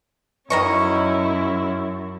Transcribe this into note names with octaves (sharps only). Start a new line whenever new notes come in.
F#2 D#3 C#4 E4 D#5 C#6